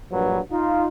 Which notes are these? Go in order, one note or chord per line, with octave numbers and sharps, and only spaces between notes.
A#1 G2 F#3 B4
D#4 F4